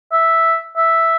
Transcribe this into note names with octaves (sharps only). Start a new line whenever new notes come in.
E5
E5